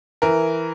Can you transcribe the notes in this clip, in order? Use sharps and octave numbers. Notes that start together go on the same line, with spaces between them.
E3 A#4